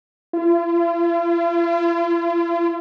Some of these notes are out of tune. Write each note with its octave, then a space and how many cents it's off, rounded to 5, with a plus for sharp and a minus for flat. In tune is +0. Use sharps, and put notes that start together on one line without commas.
F4 -40